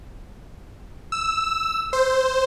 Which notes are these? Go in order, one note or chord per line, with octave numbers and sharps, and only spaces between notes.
E6
C5